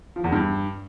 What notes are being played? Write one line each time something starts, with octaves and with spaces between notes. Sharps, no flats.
F3
E2
G2